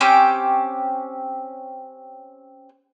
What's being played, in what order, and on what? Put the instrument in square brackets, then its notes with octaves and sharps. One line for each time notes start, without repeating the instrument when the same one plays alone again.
[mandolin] C4 C#4 G4 G5